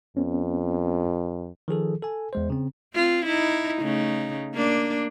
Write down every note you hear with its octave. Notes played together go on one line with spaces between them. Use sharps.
F2 B3 C#4
D#3 F3 G#4 A4
A4 G#5
E2 G#3 C5
C#3 C4
C4 F4
D#4 E4
C#3 A3 D#4
A#3 D4